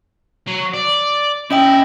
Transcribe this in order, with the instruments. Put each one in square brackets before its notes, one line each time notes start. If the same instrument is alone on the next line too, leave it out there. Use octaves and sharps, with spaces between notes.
[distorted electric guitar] F#3
D5
[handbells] C#4 D#5 G5 [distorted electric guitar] E4